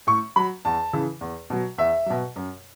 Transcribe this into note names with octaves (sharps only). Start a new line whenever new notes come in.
A2 C#6
F#3 B5
E2 A5
C#3 E3
E2
B2 F#3
E2 E5
B2 F#3
F#2